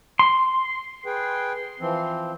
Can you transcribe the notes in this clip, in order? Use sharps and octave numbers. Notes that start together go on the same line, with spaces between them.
C6
G#4 B4 G5
E3 F3 C4